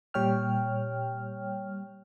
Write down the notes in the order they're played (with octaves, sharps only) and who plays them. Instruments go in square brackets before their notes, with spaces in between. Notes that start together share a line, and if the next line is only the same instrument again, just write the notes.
[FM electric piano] A#2 G3 C#5 G5 F6